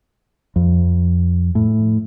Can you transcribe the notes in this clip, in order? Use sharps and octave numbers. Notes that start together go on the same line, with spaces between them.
F2
A2